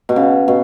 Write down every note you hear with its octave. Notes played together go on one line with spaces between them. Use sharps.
B2
C#3
B2